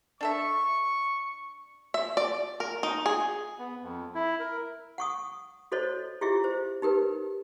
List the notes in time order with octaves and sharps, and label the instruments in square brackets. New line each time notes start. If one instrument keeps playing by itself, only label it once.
[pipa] D4 A4 E5 [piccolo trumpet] C#6
[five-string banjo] E5
D5
A#4
D#4
G#4
[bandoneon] B3
F2
E4
A#4
[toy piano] F#5 C#6 D#6
F#4 A4 C5 C#5 D#5
E4 F4 G4 G#4 D#5 E5
C5
D#4 G4 A#4 B4